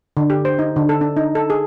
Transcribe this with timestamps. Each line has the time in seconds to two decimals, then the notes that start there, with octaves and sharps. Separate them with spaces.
0.17 D3
0.30 G4
0.45 C5
0.59 D#4
0.76 D3
0.89 A4
1.01 D4
1.17 D#4
1.35 A4
1.50 G#4